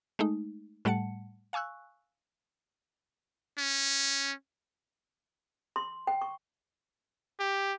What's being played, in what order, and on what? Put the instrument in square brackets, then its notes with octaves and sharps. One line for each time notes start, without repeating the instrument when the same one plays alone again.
[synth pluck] G#3 A3 D#4
A2 G3 A3 F#5 A5 C#7
F5 G#5 C#6 E6 F#6
[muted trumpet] C#4
[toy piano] C6
G5
C#6
[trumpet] G4